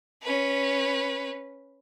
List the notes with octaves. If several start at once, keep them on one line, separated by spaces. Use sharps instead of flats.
C#4 B4